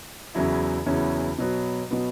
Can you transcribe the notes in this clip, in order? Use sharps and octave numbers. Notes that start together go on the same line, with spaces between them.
E2 C#3 F#3 C#4 E4
E2 C#3 F#3 C#4 E4
B2 F#3 B3
B2 F#3 B3